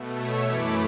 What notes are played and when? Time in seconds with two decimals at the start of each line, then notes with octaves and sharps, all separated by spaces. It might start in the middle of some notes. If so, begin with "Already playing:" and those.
Already playing: B2 A3
0.17 C#5 E5
0.45 F#2 E3 A3 B5 D6